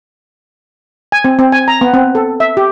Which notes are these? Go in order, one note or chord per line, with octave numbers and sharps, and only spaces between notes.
G#5
C4
C4
G#5
A#5
B3
C4
A4
E5
G4